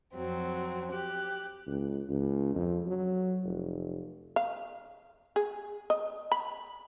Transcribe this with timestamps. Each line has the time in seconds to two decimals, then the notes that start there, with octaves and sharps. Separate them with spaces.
0.14 F2 F#3 C4
0.91 G4 F#6
1.67 C#2
2.09 C#2
2.55 F2
2.86 F#3
3.45 F1
4.36 F5
5.36 G#4
5.90 D#5
6.32 B5